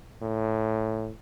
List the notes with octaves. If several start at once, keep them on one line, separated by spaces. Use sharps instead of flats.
A2